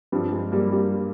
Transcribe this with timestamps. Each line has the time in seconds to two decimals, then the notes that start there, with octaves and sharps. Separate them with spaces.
0.12 G2 F3 G3
0.32 G#3
0.52 G3 A#3
0.72 G3 A#3